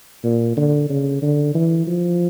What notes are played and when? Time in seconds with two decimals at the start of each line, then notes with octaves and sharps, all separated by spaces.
0.24 A#2
0.57 D3
0.90 C#3
1.22 D3
1.55 E3
1.87 F3